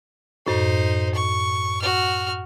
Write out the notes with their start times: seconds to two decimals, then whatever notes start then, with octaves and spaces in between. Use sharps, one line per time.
0.47 F#2 A2 D#4 C5
1.15 C#6
1.82 F#4 F6